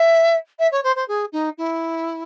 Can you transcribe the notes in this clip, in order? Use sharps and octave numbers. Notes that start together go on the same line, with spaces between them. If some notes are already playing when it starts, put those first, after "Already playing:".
Already playing: E5
E5
C#5
C5
C5
G#4
D#4
E4